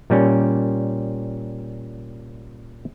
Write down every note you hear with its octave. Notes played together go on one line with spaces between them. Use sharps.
A#2 G3 C#4